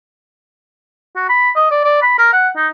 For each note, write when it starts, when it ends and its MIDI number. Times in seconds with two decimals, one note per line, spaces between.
1.16 1.26 66
1.29 1.50 83
1.55 1.67 75
1.71 1.80 74
1.84 1.99 74
2.02 2.16 83
2.18 2.30 70
2.33 2.49 78
2.56 2.68 63